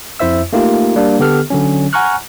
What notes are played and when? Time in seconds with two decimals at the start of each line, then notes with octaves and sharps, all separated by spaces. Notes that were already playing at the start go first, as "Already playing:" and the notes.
0.19 F2 E4 C5 E5 E6
0.53 A3 A#3 D#4 F4 G4
0.96 G3 A#3 D4
1.19 D3 B3 G4 A4 F6
1.50 D3 F#3 C#4
1.93 F#5 G#5 A#5 C#6 F6 F#6